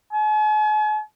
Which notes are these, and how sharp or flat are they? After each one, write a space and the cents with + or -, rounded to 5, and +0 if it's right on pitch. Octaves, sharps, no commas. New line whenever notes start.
G#5 +45